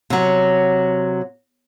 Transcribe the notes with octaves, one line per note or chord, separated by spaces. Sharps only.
C3 F#3